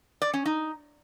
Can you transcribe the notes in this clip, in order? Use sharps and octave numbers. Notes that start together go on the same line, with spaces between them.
D5
C#4
D#4